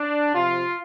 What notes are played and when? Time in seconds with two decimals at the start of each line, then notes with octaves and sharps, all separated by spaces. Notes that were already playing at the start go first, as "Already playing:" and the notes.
Already playing: D4
0.34 C3 F3 F4